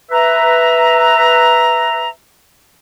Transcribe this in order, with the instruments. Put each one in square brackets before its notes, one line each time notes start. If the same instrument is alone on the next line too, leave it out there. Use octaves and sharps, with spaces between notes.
[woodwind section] B4 E5 A#5